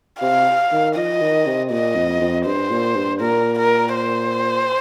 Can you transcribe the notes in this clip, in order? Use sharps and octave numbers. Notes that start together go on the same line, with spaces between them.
C3 F5
D#3
F3 D#5
D#3
C3
A#2 D#5
F2
F2
G2 C5
A#2
G2
A#2 A#4
A#4
C5